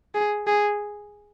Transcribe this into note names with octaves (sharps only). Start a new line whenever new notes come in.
G#4
G#4